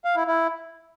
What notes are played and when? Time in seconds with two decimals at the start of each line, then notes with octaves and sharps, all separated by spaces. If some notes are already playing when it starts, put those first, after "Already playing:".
0.05 F5
0.16 E4
0.28 E4